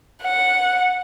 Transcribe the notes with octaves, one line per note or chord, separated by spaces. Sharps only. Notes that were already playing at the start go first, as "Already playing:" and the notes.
F#5